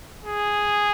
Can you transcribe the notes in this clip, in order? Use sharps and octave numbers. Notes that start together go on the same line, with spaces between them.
G#4